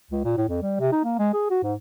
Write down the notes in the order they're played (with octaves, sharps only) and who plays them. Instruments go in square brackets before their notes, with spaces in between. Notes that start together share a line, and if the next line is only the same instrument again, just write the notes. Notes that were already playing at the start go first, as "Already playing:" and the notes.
[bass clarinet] C#2
A#2
A2
F2
G3
C3
D#4
A#3
G#3
G#4
F#4
G#2